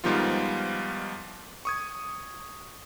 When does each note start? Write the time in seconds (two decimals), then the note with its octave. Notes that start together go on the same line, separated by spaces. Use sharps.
0.04 G#2 D#3 F3 G3 B3 F4
1.65 C#6 D#6 G#6